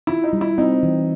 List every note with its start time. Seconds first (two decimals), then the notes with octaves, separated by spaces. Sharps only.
0.07 E4 F4
0.24 D#4
0.33 G3
0.41 E4
0.58 C4 D#4
0.83 E3